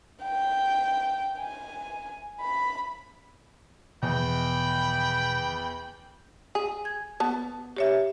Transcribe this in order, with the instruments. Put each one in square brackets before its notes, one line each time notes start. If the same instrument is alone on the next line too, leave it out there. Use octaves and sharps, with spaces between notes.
[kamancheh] G5
G#5
B5
[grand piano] E2 [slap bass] B2 D#3 F3 [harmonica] G5 B5
[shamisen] G#4
[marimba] G#6
[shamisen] B3 A5
[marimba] G4 C#5 E5